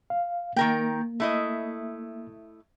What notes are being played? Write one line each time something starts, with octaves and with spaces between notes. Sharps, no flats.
F5
D#3 A#3 A#4 G5
A3 E4 D#5